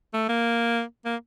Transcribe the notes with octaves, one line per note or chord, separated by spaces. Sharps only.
A3
A#3
A#3